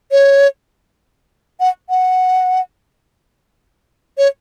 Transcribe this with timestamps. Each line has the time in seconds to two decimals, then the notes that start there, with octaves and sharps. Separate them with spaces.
0.11 C#5
1.60 F#5
1.89 F#5
4.18 C#5